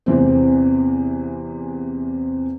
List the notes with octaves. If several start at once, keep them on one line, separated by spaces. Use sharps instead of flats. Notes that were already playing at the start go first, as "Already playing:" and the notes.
E2 C3 E3 C4